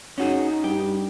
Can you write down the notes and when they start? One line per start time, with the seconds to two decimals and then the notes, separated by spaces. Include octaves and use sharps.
0.18 C#4 D#4 F#4 G#4
0.64 G2 G4